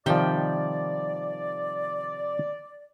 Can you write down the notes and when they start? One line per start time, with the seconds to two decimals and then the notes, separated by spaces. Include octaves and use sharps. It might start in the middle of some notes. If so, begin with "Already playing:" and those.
0.06 C3 D#3 F3 G3 D5 G5